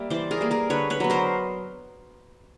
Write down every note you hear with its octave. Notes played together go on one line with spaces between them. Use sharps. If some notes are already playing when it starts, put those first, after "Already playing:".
Already playing: G3 A#3 E5
E3 C5 D5
G#4 A#4
G3 A#3
G#4 A#4
D3 B4 C#5
B4 C#5
F#3 B3
A#4 C5